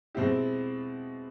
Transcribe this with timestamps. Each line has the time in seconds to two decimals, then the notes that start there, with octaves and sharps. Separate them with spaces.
0.15 B2 G#3 C4 E4 G4